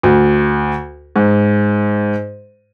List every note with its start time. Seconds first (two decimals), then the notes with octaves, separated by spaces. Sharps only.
0.03 D2
1.16 G#2